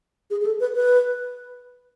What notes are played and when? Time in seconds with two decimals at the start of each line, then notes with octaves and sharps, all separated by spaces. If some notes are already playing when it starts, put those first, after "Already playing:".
0.30 G#4
0.41 G#4
0.46 A4
0.60 B4
0.76 B4